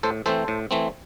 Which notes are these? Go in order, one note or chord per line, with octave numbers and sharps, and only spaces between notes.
A2 A4 C5
E3 A3 C4 A4 C5
A2
E3 A3 C4